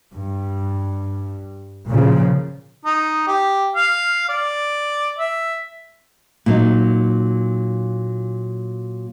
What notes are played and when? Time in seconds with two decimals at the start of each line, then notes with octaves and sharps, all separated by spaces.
0.12 G2
1.87 A#2 C#3 F3
2.85 D#4
3.27 G4
3.75 F5
4.29 D5
5.18 E5
6.46 A#2 F#3 D#4